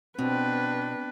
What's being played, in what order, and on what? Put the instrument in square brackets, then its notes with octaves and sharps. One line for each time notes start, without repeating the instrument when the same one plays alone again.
[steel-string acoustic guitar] B2 [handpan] C4 [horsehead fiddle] D4 B4